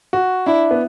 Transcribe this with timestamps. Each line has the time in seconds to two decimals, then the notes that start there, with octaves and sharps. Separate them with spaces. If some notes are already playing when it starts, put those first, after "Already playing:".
0.13 F#4
0.47 D4 E4
0.71 B3